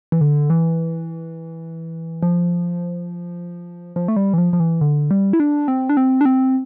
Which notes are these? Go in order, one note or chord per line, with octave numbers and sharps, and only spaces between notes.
E3
D3
E3
F3
F3
A3
G3
E3
F3
F3
E3
D3
G3
E4
D4
C4
D4
C4
D4
C4